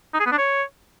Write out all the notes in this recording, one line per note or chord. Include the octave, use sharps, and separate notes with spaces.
D#4
G#4
B3
D4
C#5